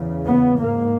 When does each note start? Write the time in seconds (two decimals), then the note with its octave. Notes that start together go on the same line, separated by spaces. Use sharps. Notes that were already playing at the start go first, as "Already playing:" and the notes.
Already playing: E2 C#3
0.25 B3
0.58 G#2 A#3